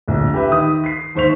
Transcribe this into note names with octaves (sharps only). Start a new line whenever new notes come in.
D1 A#1
G4 B4 E5
D#3 D#6
B6 C7
D#2 G#2 C5 C#6 B6 F7